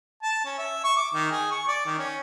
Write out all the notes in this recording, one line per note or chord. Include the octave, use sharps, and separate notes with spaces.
A5
C#4
E5
C#6
D6
D#3
G#4
C#6
D5
D#3
C#4